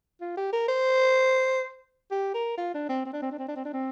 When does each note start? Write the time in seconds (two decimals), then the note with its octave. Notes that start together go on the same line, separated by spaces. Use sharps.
0.21 F4
0.37 G4
0.53 A#4
0.68 C5
2.11 G4
2.34 A#4
2.57 F4
2.74 D4
2.89 C4
3.05 C4
3.13 D4
3.22 C4
3.32 D4
3.39 C4
3.48 D4
3.56 C4
3.65 D4
3.73 C4